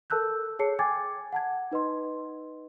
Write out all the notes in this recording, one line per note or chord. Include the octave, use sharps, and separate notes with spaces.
A4 A#4 A5 E6 F#6 G6
G#4 C#5 A5 C7 C#7
G5 G#5 D6 G#6 A6
F#5 A5 G#6
D#4 B4 D#5 C6